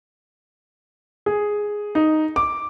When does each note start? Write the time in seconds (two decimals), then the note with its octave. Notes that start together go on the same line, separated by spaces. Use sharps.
1.26 G#4
1.95 D#4
2.36 D6